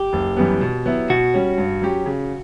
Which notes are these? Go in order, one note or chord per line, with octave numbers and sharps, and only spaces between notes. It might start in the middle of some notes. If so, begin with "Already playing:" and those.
Already playing: G4
F#1
F#2 E3 G3 B3
B2
F#3 B3 E4
B2 F#4
G3 C#4
G2
F#3 C#4 G4
C#3